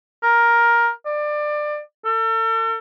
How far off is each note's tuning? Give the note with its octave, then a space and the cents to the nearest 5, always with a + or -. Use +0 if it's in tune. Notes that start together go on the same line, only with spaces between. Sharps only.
A#4 +10
D5 +25
A4 +40